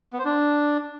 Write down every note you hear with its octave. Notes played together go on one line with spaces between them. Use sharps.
B3
C5
D4